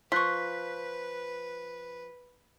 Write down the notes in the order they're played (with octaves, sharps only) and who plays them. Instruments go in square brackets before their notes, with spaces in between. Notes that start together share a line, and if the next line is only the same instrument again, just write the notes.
[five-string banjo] F3 [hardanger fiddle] B4 [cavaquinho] C6 C#6 [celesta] F#6 B6